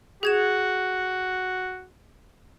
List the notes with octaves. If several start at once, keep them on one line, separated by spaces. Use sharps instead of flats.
F#4 G#4 G#6 E7